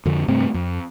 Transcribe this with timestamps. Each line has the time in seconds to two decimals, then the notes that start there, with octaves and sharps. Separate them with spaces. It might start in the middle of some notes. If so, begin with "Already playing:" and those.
0.05 F2 D3
0.28 G2 C3 A3 C4
0.54 F2